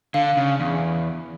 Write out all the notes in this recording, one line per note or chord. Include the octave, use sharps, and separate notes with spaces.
D3 F5
C#3
E2